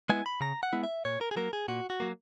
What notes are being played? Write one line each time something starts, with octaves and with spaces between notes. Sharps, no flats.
G#3 B3 E4 G#5
B5
C#3 A#5
F#5
G#3 B3 E4
E5
A#2 C#5
A#4
G#4
F#3 A#3 A#4
G#4
A#2 F#4
F#4
F#3 A#3